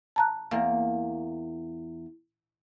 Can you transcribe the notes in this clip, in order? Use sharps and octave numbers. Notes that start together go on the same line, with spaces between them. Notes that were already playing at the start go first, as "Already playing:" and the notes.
A5 A#5 F#6
E2 A#3